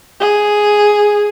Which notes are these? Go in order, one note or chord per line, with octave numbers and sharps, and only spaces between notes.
G#4